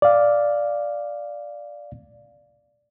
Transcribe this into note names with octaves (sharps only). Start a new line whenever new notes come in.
D5 F5